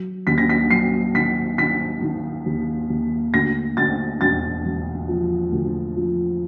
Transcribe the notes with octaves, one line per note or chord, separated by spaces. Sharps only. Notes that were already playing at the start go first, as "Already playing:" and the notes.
Already playing: F#3
D#2 B6
A#6
B6
F#3 C7
D#3 B6
D#3 B6
D#3
D#2
D#2
D2 A#6
D2 A6
E1 A6
E1
F3
D2
F3